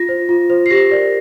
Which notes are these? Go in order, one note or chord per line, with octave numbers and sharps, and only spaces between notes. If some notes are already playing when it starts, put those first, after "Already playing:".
Already playing: F4 A#6
C5
F4
C5
C7
G4 A#6
A#4 D5